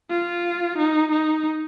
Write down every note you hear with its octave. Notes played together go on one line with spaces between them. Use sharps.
F4
D#4
D#4